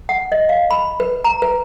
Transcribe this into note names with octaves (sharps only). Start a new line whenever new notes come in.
F#5
D#5
F5
B5
B4
A#5
B4